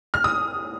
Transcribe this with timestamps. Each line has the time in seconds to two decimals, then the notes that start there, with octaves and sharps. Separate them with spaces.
0.14 F6
0.24 D#6